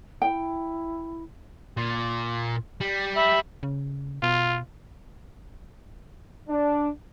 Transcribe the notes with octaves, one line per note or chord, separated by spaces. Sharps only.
E4 G5
A#2
G3
E5 B5
C#3
B2 F4
D4